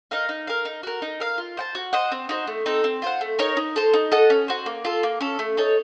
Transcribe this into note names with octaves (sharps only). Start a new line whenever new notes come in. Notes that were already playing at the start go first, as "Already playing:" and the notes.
D#4 A#4 F5
D#4
A#4 F5
D#4
F#4 A#4
D#4
A#4 F5
F4
C5 F#5 A5
F#4
C5 D#5 F#5
C4
D#4 F#4 C5
A3
C4 D#4 A4
C4
F4 C5 F#5
A3
D#4 A#4 C#5
D#4
A4 C5
D#4
A4 D#5 F#5
C#4
F#4 C5
A#3
F4 A4
A#3
C#4 A4
A3
D#4 A4 C#5